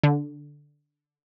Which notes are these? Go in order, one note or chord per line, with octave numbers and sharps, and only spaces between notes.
D3